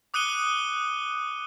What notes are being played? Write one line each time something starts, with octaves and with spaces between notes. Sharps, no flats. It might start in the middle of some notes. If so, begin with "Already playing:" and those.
D6 D#6 F#6 C#7 D#7 G7